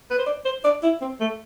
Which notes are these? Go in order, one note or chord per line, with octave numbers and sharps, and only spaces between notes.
B4
C5
D5
C5
D5
E4
C4
A3